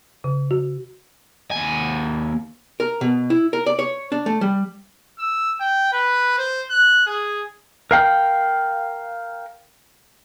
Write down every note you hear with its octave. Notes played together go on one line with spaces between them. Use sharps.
C#3
F#4
D#2 G#5
A#4
B2
E4
A#4
D5
C#5
D4
A3
G3
E6
G5
B4
C5
F#6
G#4
A#4 F5 G5